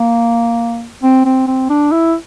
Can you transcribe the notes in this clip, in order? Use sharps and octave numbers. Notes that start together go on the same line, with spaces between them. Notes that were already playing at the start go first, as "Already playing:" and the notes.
Already playing: A#3
C4
C4
C4
D4
E4